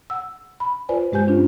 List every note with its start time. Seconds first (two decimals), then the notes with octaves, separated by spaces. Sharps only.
0.10 F#5 E6
0.60 B5
0.89 F4 B4 C5 D5 G#5
1.12 G2 G#3 G4 C5 G#5 G6
1.27 C#4 D4 F4